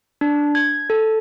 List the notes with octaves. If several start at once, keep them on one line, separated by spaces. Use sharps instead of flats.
D4
G#6
A4